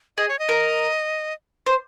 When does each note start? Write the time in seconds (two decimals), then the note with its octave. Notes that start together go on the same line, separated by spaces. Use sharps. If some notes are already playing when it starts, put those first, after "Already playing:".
0.17 G#4 D#5
0.29 C#5
0.39 D#5
0.49 A#4
1.66 C5